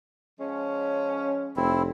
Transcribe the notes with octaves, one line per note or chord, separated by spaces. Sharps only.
F3 G#3 C#4
F1 C4 E4